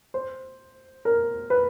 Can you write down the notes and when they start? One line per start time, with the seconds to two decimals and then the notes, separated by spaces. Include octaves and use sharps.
0.14 C5
1.05 A#4
1.50 B4